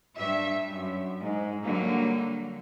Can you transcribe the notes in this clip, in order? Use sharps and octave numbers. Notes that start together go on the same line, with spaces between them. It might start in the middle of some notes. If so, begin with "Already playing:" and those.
G2 E5
F#2
G#2
D3 F#3 G3 A#3